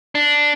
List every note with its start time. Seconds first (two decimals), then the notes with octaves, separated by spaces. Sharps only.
0.15 D4